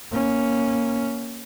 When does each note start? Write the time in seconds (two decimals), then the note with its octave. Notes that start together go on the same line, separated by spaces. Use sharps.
0.12 A#3 C#4